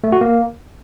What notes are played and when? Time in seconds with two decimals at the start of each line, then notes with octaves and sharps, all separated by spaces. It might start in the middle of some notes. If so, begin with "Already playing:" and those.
0.04 A3
0.12 F#4
0.21 A#3